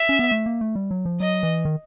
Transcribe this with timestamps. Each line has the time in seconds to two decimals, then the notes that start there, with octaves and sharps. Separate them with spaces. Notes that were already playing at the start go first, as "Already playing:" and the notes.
Already playing: E5
0.09 C#4
0.19 B3
0.31 A3
0.46 A#3
0.61 A3
0.76 G3
0.91 F#3
1.05 F3
1.20 F#3 D#5
1.43 E3
1.65 D#3